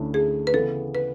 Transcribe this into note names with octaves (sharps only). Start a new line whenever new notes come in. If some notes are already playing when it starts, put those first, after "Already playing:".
Already playing: D2 D3 A3 C#4 E4
G#4
B4
C#3 E3 B3 A4
B4